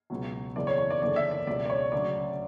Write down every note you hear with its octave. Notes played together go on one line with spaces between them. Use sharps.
C#2 B2 F#3
F#1 E2 C#3 D5
C#5
C#5
D5
F#1 E2 D3 D5
E5
D5
C#2 B2 F#3 D5
D5
C#5
D2 C#3 F#3 D5